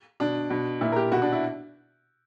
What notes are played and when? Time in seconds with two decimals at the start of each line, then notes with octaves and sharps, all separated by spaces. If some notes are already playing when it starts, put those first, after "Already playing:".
0.20 B2 D4
0.50 B2
0.81 A#2 E4
0.92 A#4
0.96 G4
1.12 B2 F#4
1.22 D4
1.33 E4